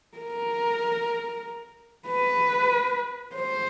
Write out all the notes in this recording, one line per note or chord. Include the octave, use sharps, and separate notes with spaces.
A#4
B4
C5